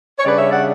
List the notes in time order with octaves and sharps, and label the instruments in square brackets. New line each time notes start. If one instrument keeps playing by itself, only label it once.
[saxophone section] C#5
C#3 G3 D4 B4 D5
C#5 E5
D5 F#5